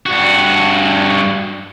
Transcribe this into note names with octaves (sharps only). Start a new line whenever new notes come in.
G2 F#4